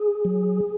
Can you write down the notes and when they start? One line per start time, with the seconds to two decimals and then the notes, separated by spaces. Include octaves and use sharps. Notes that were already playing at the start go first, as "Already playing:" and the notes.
Already playing: G#4
0.25 F#3